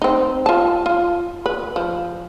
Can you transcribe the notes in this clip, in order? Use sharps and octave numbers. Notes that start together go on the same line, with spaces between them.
C4 D#4
F4 A5
F4
B4
F3